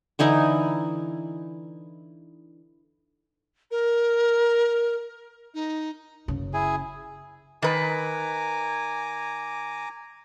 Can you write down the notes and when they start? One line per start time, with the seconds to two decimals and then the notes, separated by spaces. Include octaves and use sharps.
0.19 D3 E3 D#4 E4
3.71 A#4
5.54 D#4
6.28 F#1 C#3
6.54 E4 G#4 G#5
7.62 D#3 B4 G#5 A#5 D6